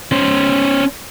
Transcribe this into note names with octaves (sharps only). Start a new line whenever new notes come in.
C#4 C5